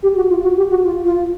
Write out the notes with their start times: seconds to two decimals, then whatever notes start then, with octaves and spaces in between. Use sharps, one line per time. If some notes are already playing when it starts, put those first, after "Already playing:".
0.03 G4
0.16 F#4
0.30 F4
0.43 F#4
0.57 G4
0.70 F#4
0.84 F4
1.05 F4